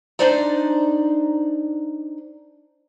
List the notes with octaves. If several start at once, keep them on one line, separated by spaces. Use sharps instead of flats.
D4 D#4 C5 D5 A#5